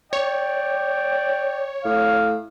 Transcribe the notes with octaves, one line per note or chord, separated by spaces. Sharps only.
C#5 D5 G5
A2 F5